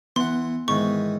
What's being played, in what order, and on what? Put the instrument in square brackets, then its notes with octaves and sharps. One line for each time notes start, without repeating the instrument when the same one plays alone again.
[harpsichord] E3 F#5 [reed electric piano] B3 [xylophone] C6
[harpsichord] G#2 D#3 E3 [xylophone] C#6